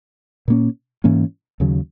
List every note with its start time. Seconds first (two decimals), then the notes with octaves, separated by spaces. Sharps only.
0.48 A#2 A#3 C#4
1.04 G#2 E3 A#3 C#4
1.60 D#2 C#3 F#3